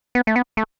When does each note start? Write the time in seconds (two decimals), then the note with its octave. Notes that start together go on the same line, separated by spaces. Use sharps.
0.15 B3
0.27 A3
0.36 B3
0.57 A3